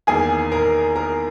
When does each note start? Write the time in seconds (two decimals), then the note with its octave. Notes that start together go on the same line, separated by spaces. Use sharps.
0.07 E2 D#3 A#3 G#4 G#5
0.52 A#4 A#5
0.96 A#4 A#5